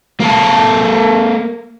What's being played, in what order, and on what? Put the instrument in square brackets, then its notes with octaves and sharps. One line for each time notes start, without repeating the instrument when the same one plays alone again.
[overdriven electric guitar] A#3 A4